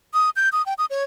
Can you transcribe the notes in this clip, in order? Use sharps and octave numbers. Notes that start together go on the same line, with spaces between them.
D#6
G6
D#6
G5
D#6
C#5